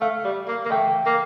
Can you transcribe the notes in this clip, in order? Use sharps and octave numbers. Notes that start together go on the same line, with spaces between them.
A3 F5
G3
A#3
A#3
A3 G5
A#3